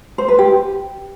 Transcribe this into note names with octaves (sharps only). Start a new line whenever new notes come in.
C5
B4
G4